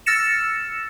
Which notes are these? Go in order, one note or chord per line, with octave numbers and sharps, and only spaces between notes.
E6 F6 A6 A#6 C#7 E7